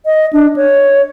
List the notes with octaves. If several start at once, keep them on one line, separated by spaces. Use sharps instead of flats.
D#5
D4
C#5